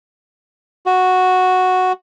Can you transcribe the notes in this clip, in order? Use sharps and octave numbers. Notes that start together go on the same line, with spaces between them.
F#4